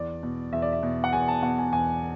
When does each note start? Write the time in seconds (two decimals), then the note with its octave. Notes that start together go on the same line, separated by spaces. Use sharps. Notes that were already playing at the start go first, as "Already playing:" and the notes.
Already playing: E2 D5
0.23 B2
0.53 E2 E5
0.62 D5
0.73 E5
0.83 B2
1.04 F#5
1.13 E2 G#5
1.28 A5
1.42 B2 F#5
1.59 G#5
1.72 E2 G#5